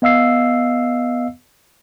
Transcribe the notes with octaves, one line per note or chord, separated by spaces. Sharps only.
B3 D#5 F5 E6 C7